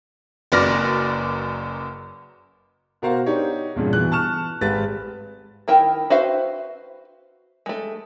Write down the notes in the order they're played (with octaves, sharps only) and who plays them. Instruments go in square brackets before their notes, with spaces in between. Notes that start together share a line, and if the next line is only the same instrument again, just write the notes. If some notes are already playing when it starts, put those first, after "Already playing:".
[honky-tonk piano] F#1 F#2 B4 D5 F6 A#6
[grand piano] B2 F#4 A#4 C5 F5
D4 D#4 G4 C#5
E2 G2 A#2 C#3
B2 E3 F#6
A5 C#6 F6 E7
G#1 G#2 G4 B4 A6
[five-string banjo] D#3 E4 A#4 G5
F#4 B4 C5 E5 F5
G#3 A3